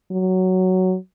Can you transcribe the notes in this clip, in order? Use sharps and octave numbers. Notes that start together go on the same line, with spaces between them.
F#3